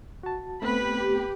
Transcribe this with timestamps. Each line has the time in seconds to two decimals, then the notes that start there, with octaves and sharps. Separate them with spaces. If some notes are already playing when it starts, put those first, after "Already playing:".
0.23 F#4 A5
0.62 A3 B3 C4 G4 B4 B5